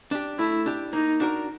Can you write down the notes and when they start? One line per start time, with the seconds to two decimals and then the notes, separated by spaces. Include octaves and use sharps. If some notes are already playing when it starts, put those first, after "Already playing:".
0.11 D4 G4
0.39 A3 E4
0.66 D4 G4
0.93 A#3 D#4
1.20 D4 F#4 A#4